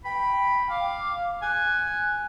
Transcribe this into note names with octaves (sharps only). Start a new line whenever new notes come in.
G5 B5
F5 D6
G#5 F#6